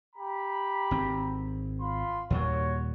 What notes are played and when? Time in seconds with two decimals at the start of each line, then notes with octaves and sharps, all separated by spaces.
0.16 G4 A#5 B5
0.91 G#1 C4
1.80 F4 B5 C6
2.30 D#2 A#2 G3 F#4 C#5